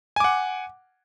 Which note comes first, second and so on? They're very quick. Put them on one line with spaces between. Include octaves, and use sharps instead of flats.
G#5 D6 F#5